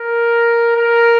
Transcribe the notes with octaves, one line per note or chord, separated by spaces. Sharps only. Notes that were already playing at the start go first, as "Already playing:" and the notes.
Already playing: A#4
A#4